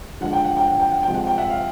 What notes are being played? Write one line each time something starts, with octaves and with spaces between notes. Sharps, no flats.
D3 F3 G#3 F#5
G5
F#5
G5
F#5
G5
F#5
C3 F3 G#3 G5
F#5
G5
E5 F#5
F5